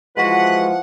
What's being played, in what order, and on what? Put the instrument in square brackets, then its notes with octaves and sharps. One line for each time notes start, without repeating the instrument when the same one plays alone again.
[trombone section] E3 F3 [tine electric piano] G#3 F#4 [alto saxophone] B4 [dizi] F#5